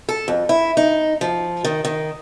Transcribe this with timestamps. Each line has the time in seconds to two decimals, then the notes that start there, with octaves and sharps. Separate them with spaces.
0.09 A4
0.28 F2
0.49 E4
0.77 D#4
1.21 F3
1.65 D#3
1.85 D#3